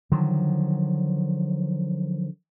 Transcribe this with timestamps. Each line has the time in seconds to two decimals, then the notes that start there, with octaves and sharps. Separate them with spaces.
0.12 D3 D#3 F3 F#3